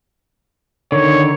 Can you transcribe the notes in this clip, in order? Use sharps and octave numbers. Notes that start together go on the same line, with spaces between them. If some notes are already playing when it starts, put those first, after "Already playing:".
D3 D#3 C#5